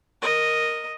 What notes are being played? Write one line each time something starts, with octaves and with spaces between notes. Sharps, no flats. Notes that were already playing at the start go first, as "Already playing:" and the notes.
A#4 D#5